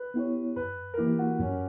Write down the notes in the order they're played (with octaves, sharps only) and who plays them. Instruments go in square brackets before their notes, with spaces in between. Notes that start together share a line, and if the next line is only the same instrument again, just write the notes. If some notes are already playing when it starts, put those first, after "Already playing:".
Already playing: [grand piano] B4
[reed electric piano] B3 E4 G4 C#5
[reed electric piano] F#2 [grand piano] B4
[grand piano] A#4
[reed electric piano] E3 A#3 E4 [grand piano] G4
[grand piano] F#4
[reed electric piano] F#2 [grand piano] C#4